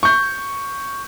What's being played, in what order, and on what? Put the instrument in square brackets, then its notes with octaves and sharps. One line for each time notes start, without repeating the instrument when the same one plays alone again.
[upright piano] C#6 G6